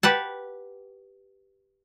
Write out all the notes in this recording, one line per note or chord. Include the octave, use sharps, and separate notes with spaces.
G4 B4 F#5 A5